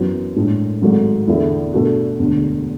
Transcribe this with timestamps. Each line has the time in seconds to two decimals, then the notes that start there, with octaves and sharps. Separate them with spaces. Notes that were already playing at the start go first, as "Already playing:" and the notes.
Already playing: F#2 E3 B3 F#4
0.36 A2 G#3 D4
0.82 G#1 G#2 F#3 A3
1.28 E2 D3 A3 E4
1.73 B2 A3 D4 F#4
2.19 E1 D2 D3